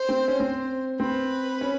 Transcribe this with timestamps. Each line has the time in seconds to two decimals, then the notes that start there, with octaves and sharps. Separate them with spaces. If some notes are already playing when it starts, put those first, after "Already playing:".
Already playing: C5
0.09 C4
0.28 C#4
0.40 C4
1.00 C4 B4
1.61 C#4